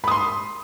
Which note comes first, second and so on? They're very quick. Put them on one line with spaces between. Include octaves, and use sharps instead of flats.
B5 D#6 C6